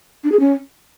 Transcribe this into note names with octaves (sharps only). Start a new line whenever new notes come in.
D4
G#4
C#4